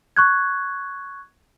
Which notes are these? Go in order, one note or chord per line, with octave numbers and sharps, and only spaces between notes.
C#6 F#6 G#6